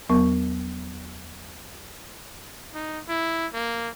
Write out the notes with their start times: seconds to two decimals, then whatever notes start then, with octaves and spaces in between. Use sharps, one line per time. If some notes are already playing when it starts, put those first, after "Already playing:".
0.09 E2 F#3 B3 A#4 C#6
2.74 D#4
3.09 E4
3.54 A#3